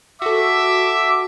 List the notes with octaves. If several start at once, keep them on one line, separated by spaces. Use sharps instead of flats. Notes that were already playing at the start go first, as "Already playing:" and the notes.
F#4 A4 E5 D6